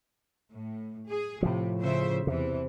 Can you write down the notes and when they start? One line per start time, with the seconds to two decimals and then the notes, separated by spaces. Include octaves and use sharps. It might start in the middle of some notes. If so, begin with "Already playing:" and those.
0.53 A2
1.10 G#4
1.42 A2 C3 F3
1.80 C#3 C5 E5
2.27 E2 C3 E3